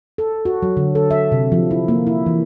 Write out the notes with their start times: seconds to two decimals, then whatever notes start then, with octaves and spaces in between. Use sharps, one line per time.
0.18 A4
0.45 F#4
0.62 F#3
0.77 D3
0.95 A4
1.11 E5
1.32 C3
1.52 F3
1.71 E4
1.88 A#3
2.07 E4
2.26 E3